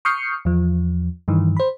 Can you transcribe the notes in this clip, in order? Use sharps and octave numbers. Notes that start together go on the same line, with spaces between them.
C#6 D#6 F6 G6 C7 C#7
E2 F3
G2 D#3 E3
C5 B5